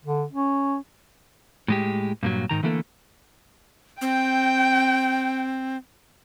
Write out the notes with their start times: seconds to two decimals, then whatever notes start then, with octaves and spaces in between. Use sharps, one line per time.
0.05 D3
0.33 C#4
1.68 A2 G#3 G4
2.23 G2 A#2 F#3
2.49 G#2 D#3 A#5
2.63 D3 E3 A3 A#3 A4
4.01 C4 G5